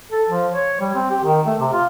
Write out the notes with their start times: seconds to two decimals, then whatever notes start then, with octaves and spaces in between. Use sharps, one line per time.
0.11 A4
0.29 F3
0.52 C#5
0.81 G3
0.95 C4
1.10 G4
1.24 D#3
1.46 A3
1.59 C3
1.73 F4